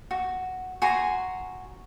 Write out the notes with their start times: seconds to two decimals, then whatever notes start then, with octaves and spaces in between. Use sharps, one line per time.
0.11 F#4
0.82 F#4 G#5 A#5 C6